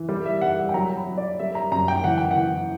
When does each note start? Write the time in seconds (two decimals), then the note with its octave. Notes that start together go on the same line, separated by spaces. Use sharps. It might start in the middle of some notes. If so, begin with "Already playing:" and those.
Already playing: E3
0.09 G3
0.25 E5
0.41 G3 F#5
0.69 G5
0.74 F#3 A#5
0.96 B5
1.07 F#3
1.18 D5
1.39 G3 E5
1.55 A#5
1.72 F#2 A#5
1.88 G5
2.04 E3 F#5
2.18 G5
2.31 F#5
2.37 E3